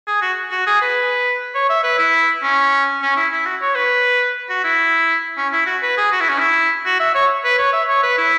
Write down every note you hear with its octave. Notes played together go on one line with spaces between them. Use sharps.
G#4
F#4
F#4
G#4
B4
C#5
E5
B4
E4
C#4
C#4
E4
E4
F#4
C#5
B4
F#4
E4
C#4
E4
F#4
B4
G#4
F#4
E4
C#4
E4
F#4
E5
C#5
B4
C#5
E5
C#5
B4
E4